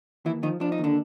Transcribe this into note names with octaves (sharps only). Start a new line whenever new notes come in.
D#2 E3 E4
D#3 F3 D#4
F3 D4
D#4
D#2
D3 D4